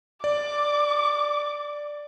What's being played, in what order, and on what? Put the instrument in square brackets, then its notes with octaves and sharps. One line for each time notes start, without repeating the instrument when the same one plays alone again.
[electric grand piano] D5 [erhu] D6